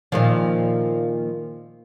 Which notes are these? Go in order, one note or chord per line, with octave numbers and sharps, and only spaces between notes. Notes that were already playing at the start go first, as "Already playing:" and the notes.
A#2 D#3 F3